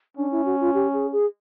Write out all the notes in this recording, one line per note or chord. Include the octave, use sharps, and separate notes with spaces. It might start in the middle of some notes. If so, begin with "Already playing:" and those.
C#4 D4
E4
F#4
F4
G4
G#4
G#4